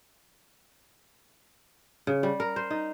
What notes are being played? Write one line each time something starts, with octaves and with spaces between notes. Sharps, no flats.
C#3
G3
A#4
C5
D#4